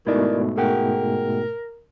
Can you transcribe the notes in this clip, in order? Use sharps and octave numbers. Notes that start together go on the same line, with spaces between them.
G#2 B2 D#3 A3 E4 D5
G#4 A#4 F#5 G5